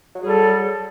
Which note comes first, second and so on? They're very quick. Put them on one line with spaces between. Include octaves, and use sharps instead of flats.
F#3 G#4 G3 A4